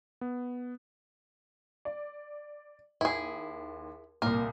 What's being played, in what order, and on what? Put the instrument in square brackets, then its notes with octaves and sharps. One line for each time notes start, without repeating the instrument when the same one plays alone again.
[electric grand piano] B3
[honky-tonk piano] D5
[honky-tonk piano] D#2 [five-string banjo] E4 G#4
[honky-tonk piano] C2 A#2 [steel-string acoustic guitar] A#3 [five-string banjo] A#4